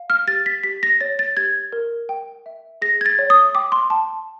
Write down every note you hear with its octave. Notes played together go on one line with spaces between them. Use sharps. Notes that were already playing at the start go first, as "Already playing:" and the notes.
Already playing: F5
F6
G4 A6
B6
G4 B6
A#6
C#5 A6
A6
G4 G#6
A#4
G5
E5
G#4 A#6
G#6
A6
C#5
D#6
G5 D6
C6
G5 A5